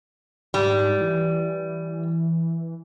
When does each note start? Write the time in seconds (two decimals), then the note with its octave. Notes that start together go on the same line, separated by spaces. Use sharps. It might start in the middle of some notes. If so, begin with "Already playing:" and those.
0.54 G#2 G3
1.01 E3